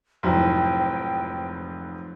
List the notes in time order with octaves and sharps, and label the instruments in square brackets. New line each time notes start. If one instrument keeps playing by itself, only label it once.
[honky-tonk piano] F1 [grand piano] F2 G#2 F#3 [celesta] E4 F#4 C6 [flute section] G5